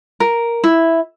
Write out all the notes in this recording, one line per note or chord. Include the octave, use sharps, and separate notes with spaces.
A#4
E4